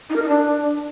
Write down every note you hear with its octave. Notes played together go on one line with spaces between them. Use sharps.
D#4
A#4
D#4
D4